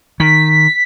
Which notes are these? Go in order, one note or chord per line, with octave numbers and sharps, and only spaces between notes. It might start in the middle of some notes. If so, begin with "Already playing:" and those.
D#3 B6